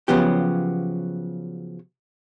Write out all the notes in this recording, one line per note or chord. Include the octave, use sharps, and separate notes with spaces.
C#3 F3 F#3 B3 G4